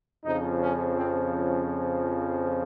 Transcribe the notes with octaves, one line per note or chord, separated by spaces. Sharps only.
F2 C#3 F3 D#4
C#4
C4
C#4